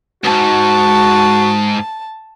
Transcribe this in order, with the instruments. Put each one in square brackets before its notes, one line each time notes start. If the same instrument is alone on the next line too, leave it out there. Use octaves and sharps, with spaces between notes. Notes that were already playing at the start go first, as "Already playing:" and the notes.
[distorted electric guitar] C#2 G#2 [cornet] F#4 [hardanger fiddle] A5